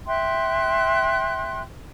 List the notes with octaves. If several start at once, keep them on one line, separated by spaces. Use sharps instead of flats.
E5 G5 C6 F#6